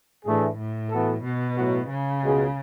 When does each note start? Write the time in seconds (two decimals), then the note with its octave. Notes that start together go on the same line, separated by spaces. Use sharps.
0.25 A2 E3 A3 D4 G#4
0.58 A2
0.90 E3 B3 F#4 A4
1.24 B2
1.57 A2 F#3 B3 F#4
1.89 C#3
2.22 C#2 B2 G#3